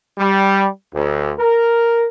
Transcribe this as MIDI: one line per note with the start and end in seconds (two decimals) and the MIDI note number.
0.18 0.66 55
0.93 1.32 38
1.38 2.07 70